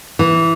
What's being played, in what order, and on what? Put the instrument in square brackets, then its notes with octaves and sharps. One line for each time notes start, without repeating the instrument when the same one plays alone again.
[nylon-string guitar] E3